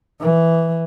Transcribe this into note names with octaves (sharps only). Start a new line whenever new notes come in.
E3